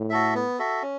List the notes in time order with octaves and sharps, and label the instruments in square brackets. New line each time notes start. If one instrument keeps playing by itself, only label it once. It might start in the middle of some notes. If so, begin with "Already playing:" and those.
Already playing: [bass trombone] A2
[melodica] F#4 A4 E5
B3
F#4 A4 E5
C#4